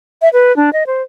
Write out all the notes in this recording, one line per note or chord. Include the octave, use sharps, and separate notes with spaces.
E5
B4
D4
D#5
C5